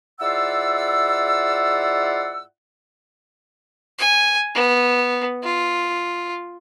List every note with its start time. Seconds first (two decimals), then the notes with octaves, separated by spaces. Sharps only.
0.21 G#2 E4 F4 D5 F#5 E6
3.99 G#5
4.55 B3
5.44 F4